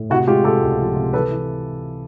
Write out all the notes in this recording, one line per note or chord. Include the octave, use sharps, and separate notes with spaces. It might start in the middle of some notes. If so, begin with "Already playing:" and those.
Already playing: A2
C3 E4 F#4
G#3 F4 G4
C3 G4 A4
C#2
F3
C3
E3 A4 B4
E3